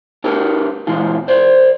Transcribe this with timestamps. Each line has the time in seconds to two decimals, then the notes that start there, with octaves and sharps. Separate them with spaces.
0.24 D4 G4 A#4 B4
0.87 A#2 E3 G#3 F4
1.28 C5 D5